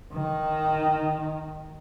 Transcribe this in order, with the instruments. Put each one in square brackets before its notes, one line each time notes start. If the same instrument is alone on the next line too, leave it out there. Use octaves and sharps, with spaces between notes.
[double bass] D#3